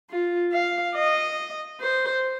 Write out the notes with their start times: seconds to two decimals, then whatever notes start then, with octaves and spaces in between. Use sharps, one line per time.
0.10 F4
0.53 F5
0.95 D#5
1.80 C5